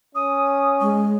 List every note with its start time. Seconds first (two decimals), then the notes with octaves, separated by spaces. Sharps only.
0.15 C#4 D#6
0.81 G#3